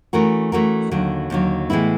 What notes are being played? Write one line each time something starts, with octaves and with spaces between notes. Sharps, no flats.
E3 A3 C#4 F#4 A#4
E3 A3 C#4 F#4 A#4
D#2 D3 F#3
D#2 D3 F#3
A2 E3 G#3 B3 E4